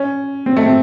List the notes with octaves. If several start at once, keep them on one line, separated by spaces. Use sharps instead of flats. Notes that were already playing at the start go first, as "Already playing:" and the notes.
Already playing: C#4
C4
A3
C4